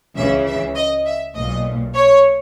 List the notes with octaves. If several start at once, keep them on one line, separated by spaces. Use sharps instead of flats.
C#2 C#3 E3 E5
E5
D#5
E5
B1 A#2 D#5
C#5